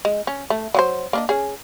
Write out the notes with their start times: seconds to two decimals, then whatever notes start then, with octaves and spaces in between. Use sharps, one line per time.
0.05 G#3
0.27 C#4
0.50 A3
0.74 F#3 F#4 C5
1.13 A#3 D4 D#5
1.29 C#4 G#4